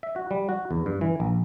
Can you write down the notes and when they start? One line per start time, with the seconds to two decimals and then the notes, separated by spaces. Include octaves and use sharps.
0.03 E5
0.16 F#4
0.31 G3
0.49 F#4
0.71 E2
0.86 G2
1.01 E3
1.20 A#1